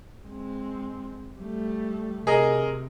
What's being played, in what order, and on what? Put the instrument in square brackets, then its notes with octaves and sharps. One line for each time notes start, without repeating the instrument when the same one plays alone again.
[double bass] G#3 C4
G3 A3
[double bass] C3 [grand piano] G#4 A#4 D#5